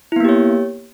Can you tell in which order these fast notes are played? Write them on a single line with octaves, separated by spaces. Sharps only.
E4 B3 A#3 G4 C#5